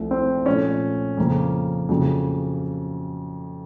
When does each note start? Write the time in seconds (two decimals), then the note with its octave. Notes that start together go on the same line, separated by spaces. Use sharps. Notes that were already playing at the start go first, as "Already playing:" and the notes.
Already playing: C2 C3 F3 A3
0.11 C4
0.46 A#2 F3 A3 C#4
1.17 F2 C#3 F3 A#3
1.89 F2 C#3 F#3 A#3